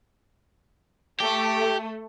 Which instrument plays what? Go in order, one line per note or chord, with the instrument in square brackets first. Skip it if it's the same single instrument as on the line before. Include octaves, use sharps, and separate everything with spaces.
[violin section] A3 [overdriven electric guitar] G4